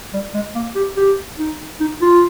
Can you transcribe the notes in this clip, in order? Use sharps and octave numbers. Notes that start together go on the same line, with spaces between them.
G3
G#3
A#3
G4
G4
D#4
D#4
F4